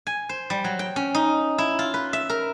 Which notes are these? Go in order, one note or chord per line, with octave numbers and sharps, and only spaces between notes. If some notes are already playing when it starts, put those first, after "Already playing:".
G#5
C5
G3
F#3
G5
C#4
D#4
E4
F4
B4
E5
A#4